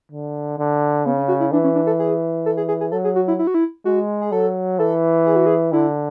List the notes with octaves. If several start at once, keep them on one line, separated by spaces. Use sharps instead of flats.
D3
D3
C#3 B3
C#4
F#4
E4
E3 D4
C#4
D4
A4
G#4
A4
G#4
G#4
G#4
F#3 A4
G#4
F#4
E4
E4
F#4
E4
G#3 F#4
G#4
F#3 A4
E3 A4
G#4
F#4
G#4
D3 E4